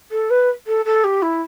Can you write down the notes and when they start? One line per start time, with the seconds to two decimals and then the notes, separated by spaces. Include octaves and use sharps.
0.11 A4
0.30 B4
0.67 A4
0.85 A4
1.03 G4
1.22 E4